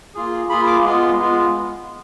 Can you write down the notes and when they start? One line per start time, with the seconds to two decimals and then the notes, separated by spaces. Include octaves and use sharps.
0.15 A#3 F4 G#4
0.49 A#3 F4 G#4 B5
0.66 D6
0.84 G#3 B3 F4
1.19 G#3 B3 F4